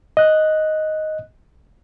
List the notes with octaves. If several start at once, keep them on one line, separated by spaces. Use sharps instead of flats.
D#5 F#6